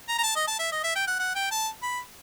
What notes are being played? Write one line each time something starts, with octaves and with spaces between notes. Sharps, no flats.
A#5
A#5
A5
D#5
A5
E5
D#5
E5
G5
F#5
F#5
G5
A5
B5